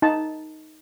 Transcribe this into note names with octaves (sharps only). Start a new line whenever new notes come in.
D#4 A5